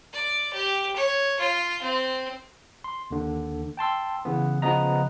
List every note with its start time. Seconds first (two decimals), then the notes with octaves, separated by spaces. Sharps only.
0.13 D5
0.53 G4
0.96 C#5
1.40 F4
1.81 C4
2.84 C6
3.11 D#2 D3
3.77 G5 A5 C6 E6
4.25 C#3 E3 B3
4.62 C#3 F3 B3 B4 D#5 A#5